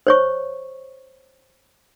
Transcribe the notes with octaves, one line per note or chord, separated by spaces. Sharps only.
C5 C#5 C#6